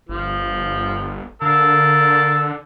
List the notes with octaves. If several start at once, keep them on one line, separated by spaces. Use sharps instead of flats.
G1 F3
D3 A#3 A5 E6